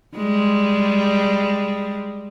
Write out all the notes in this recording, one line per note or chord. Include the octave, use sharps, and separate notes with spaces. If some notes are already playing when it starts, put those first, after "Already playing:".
G3 G#3